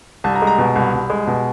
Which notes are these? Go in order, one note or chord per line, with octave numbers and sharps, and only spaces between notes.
C2 A5
A#5
G#3
A#5
B2
C2
C2
G#3
B2